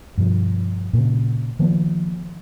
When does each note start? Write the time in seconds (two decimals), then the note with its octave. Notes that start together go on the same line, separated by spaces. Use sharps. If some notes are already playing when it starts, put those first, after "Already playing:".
0.18 G2 B2 F3
0.93 A#2 C#3
1.59 D#3 F3 A#3 B3